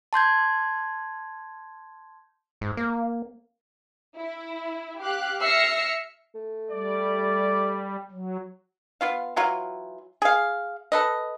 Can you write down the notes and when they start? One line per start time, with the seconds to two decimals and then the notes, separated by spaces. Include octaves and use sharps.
0.13 A5 C6 G6 G#6
2.61 G#2
2.77 A#3
4.17 E4
5.01 G4 F5 F#6
5.42 E5 E6 F6 A#6 C7 C#7
6.35 A3
6.72 G3 D5
8.11 F#3
9.01 B3 F4 F5
9.36 E3 F#3 F4
10.22 G#4 F5
10.92 A4 B4 D#5